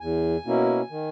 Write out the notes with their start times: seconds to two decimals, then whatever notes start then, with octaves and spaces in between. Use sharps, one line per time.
0.01 E2 G#5
0.45 B2 A#3 C#4 E4
0.90 D#3